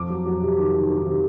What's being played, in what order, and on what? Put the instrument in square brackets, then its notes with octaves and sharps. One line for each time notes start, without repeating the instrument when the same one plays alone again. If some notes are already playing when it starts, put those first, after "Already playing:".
Already playing: [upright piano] F2 D6
F#3
F#3
C3
D#3
D#3
D#3
C3